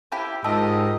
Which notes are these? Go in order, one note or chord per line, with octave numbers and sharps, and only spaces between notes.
E4 G4 C5
G#2 F4 G4 A#4 D#5 A5 E6